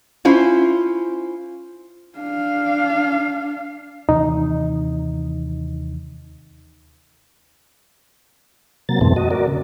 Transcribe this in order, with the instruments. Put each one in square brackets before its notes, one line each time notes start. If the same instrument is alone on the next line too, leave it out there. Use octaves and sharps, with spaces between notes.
[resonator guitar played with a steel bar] C#4 E4 F4 C5
[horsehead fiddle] D4 F5
[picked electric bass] D#2 C3 E3 [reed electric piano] D#4
[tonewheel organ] C3 F#3 A#3 A6
F2 G#2 B2 E3 A3 C4
F#4 D#5
F#4 A#4 D5
C#3